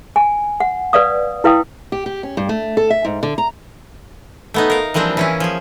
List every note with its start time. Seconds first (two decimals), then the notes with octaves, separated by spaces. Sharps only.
0.16 G#5
0.60 F#5
0.93 B4 D5 F5 D#6
1.44 E4 B4 F5 G5 D#6
1.92 G4
2.06 G4
2.23 C#4
2.37 G2
2.49 A3
2.77 A4
2.90 E5
3.05 G#2
3.23 D3
3.38 A#5
4.54 A3 B3 D#4
4.70 A#4 F5
4.94 E3 F3 G3 A#3 C4 D4
5.17 E3 C#4 E4
5.40 F3 G#4